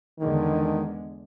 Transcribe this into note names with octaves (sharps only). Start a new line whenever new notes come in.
E2 D3 D#3 G#3